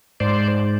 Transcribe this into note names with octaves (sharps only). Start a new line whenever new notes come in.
G#2 C5 D5